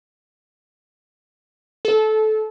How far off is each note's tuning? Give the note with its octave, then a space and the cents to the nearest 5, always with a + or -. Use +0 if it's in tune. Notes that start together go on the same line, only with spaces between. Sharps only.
A4 -20